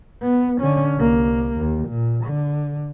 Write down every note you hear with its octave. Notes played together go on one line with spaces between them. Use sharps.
B3
D3 C#4
C2 A#3
D#2
A#2
D3